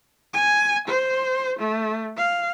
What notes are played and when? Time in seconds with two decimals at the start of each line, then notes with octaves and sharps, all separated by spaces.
0.34 G#5
0.88 C5
1.60 A3
2.17 F5